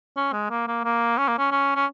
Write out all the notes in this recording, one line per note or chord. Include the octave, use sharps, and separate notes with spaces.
C#4
G#3
A#3
A#3
A#3
C#4
A#3
C#4
C#4
C#4